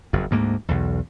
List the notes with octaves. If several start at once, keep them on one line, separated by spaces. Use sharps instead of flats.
F#1 F2
D2 G#2 A#3
B1 E2